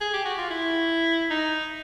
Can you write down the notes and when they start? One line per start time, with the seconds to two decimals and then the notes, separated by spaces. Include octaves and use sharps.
0.01 G#4
0.13 G4
0.25 F#4
0.37 F4
0.50 E4
1.30 D#4